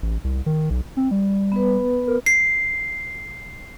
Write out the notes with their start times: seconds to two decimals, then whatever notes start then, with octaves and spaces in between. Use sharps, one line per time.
0.02 A1
0.24 C2
0.46 D#3
0.70 B1
0.97 C4
1.11 G3
1.52 B3 B4
2.08 A#4
2.26 C7